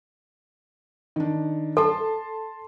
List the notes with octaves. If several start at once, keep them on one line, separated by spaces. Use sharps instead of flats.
D#3 D4
A4 A5 C6